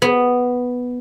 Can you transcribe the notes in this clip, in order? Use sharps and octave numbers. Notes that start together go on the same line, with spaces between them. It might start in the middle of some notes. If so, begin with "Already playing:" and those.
B3